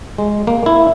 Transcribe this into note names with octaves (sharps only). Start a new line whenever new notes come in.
G#3
A#3
E4